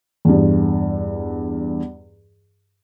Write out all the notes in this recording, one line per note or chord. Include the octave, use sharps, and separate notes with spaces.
E2 G2